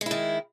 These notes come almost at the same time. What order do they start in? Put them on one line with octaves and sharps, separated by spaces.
G#3 E4 D#3